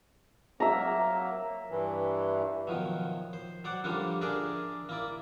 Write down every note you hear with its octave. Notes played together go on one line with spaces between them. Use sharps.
F#3 A#3 E5 A#5
G2 E3
B2 D#3 F3 F#3
C5
F#3 C5 D5 F#5
D3 F3 G3 A#3 D4
D4 G#4 A#4 D5 E5
A#3 E4 D5